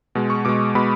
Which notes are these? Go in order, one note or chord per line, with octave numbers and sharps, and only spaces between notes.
B2 G#3
C#6
B2 G#3 D6
B2 G#3 B5